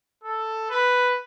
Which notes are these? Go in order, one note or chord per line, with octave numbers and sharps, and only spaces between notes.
A4
B4